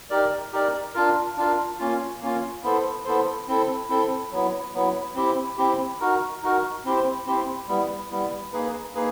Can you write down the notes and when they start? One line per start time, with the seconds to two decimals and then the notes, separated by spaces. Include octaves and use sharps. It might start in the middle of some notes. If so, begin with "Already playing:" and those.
0.10 D#4 G4 A#4 D5
0.53 D#4 G4 A#4 D5
0.94 D4 F4 A#4
1.37 D4 F4 A#4
1.79 A#3 C#4 F4
2.21 A#3 C#4 F4
2.63 B3 E4 A4 C5
3.05 B3 E4 A4 C5
3.48 C4 E4 A4
3.89 C4 E4 A4
4.32 F#3 B3 E4
4.74 F#3 B3 E4
5.15 C4 E4 G4
5.57 C4 E4 G4
6.00 D#4 F#4 A#4
6.42 D#4 F#4 A#4
6.85 C4 E4 G4 C5
7.26 C4 E4 G4 C5
7.68 G3 B3 E4
8.11 G3 B3 E4
8.53 A#3 D#4 G#4 B4
8.95 A#3 D#4 G#4 B4